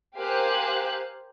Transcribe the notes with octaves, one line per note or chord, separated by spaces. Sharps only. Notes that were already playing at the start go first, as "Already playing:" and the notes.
G4 A#4 C5 F5 G#5 F#6